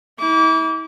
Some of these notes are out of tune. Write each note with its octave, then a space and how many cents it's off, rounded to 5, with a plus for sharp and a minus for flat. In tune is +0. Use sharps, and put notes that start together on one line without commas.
E4 -40 D6 -30